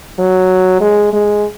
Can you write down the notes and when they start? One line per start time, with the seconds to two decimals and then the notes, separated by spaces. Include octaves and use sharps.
0.19 F#3
0.81 G#3
1.13 G#3